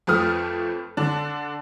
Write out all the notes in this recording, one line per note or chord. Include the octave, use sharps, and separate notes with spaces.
F2 F3 A3 B4 D#6 F6
D3 D4